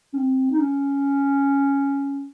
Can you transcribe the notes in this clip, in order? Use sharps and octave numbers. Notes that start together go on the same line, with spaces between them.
C#4
C4
D#4
C#4